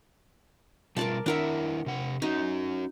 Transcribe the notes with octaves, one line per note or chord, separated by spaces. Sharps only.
B2 G3 F4 A#4 D5 A5
D#3 D4 E4 A#4 E5 F#5
C3 F#5
C#4 D#4 F#4